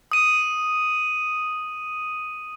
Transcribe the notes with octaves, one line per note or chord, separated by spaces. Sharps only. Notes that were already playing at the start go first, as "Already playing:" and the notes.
D#6 D#7